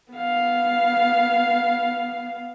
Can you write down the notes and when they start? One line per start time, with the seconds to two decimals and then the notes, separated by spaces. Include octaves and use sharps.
0.13 B3 F5